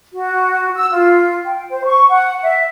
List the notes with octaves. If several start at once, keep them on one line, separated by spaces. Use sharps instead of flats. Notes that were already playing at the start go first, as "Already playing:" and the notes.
F#4
E6
F4
G5
C5
C#6
F#5
E5